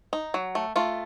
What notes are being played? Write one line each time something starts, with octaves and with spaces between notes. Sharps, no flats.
D#4
F#3
A3
A3 F4